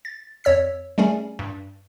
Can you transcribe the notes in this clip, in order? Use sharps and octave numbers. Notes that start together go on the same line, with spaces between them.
A6
F2 C#5 E6 B6
G3 A3 C#4 G#4
G2